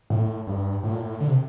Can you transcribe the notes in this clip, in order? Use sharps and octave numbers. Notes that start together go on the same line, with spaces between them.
A2
G2
A2
A#2
A2
D3
C3